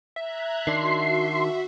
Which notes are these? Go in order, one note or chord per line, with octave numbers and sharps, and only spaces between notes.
E5 A#5 F#6 G#6
D#3 D4 F#4 C6